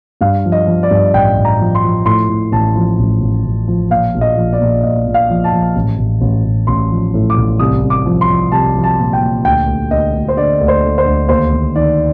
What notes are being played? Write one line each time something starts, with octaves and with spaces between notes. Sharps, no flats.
G2 F5
F3
D#5
F3
D5
G2
A1 G5
A1
A#5
F3
C6
F3
A2 C6
A2
A1 A5
F3
A1
A1
A1
F3
A#2 F5
A#1
D#5
F3
D5
A#1
A#2 D#5
A#2
F5
F3
A5
F3
A1
A1
A1
A1
A1 C6
F3
A2
D6
A1
C2 D#6
C2
D6
F3
C6
F3
C2 A5
F3
A5
A#2
G5
A#2
D2 G5
D2
D2 D#5
D2
C5
D3 D5
D2
C5
D3
C5
D2
D#2 C5
D#2
D#3 D5